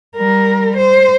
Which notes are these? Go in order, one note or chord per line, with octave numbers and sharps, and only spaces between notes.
G3 A#4
C5